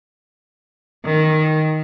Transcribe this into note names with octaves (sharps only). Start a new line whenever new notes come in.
D#3